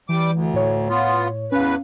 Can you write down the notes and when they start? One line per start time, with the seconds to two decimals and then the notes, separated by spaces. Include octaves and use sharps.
0.09 E3 G3 D6
0.32 D2
0.53 A2 C#5
0.89 B3 F4
1.52 E2 C#4 B4 F5